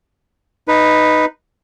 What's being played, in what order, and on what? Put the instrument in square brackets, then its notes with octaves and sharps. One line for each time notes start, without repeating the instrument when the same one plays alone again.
[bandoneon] D#4 B4